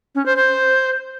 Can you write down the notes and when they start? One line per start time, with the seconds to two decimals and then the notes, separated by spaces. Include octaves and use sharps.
0.15 C#4
0.26 C5
0.36 C5